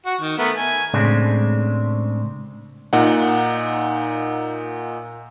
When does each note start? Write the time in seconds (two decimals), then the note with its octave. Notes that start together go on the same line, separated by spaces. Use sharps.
0.06 F#4
0.21 D#3
0.38 A3 B3 A#4
0.56 G#5
0.94 A2 C#3 G#3 C4 D4
2.93 A#2 D#4 F#5